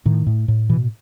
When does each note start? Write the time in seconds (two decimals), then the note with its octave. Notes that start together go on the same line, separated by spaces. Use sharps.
0.06 A2 D#3
0.27 A2
0.48 A2
0.69 B2 E3